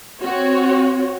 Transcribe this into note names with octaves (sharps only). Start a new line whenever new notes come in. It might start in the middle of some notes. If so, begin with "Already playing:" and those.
C4 F#4 C#5